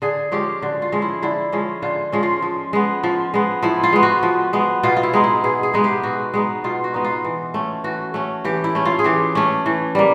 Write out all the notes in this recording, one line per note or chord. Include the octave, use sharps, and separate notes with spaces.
D3 G#4
F3 G#3 C#4 G4
D3 F#4
F4
F3 G#3 C#4
E4
D3 E4
F3 G#3 C#4
D3 F4
F3 G#3 C#4
F4
F3
G#3 B3
F3
G#3 B3
F3 E4
F4
G#3 B3
F#4
F3
G#3 B3
B2 F4
F4
E4
G#3 B3 D#4
E4
B2 G#4
G#4
G#3 B3 D#4
G4
B2 F#4
G#3 B3 D#4
B2 F4
F#4
G#3 B3 D#4
F4
E3
A3 C#4
E3 F#4
A3 C#4
E3 G4
E4
A3 C#4
F4
G#4
E3 G4
A3 C#4
E3
G3 A#3